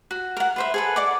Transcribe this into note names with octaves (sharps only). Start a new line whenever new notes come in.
F#4
A#4 F#5
B4 C5 E5
G#4 A4 B4
D5 F#5 D6